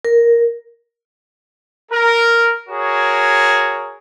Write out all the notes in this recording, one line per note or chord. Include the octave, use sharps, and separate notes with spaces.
A#4
A#4
F#4 G#4 A#4 C#5